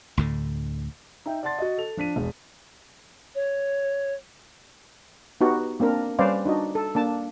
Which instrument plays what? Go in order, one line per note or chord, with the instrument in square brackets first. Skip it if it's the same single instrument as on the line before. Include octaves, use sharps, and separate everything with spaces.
[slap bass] D2 A2 D3
[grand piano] D#4 E5 G5
D5 F#5 A5 C6 A6
F#4 D#5
A4 F7
F3 D4 B6 D#7
E1
[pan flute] C#5
[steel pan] B3 D#4 F#4 G4
A#3 C4 D4 A#4
G3 C#4 B4 C5 D5 F5
D4 D#4 F#4 D#5
A4
A#3 D4 A5